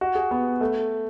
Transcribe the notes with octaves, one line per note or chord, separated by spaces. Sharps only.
F#4
G#4
B3
A3